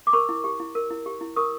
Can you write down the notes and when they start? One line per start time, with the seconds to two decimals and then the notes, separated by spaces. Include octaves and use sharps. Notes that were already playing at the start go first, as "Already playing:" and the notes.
0.07 D6
0.13 A#4 B5 C#6
0.29 E4
0.44 G4
0.60 E4
0.75 A#4
0.90 E4
1.06 G4
1.21 E4
1.36 A#4 C#6 D#6